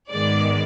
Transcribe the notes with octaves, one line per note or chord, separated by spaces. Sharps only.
G#2 D#3 G#3 B3 D5